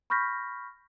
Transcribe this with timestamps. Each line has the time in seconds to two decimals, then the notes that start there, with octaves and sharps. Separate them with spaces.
0.10 B5 C#6 F6 G6 A#6 B6